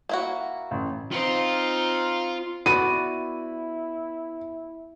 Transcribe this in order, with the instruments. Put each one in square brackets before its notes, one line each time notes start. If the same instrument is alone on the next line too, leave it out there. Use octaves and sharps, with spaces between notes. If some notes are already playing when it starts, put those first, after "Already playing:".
[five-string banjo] A#3 E4 F#4
[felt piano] A1
[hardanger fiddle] C4 D#4 [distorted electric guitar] F4
[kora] B3 [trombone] E4 [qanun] F#4 D5 F#5 [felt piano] D#7